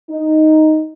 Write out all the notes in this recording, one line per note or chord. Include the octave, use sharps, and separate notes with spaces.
D#4